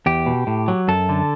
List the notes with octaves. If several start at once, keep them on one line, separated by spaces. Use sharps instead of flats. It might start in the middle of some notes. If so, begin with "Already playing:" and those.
E2 G4
B2
A2
F#3
F#2 A4
D3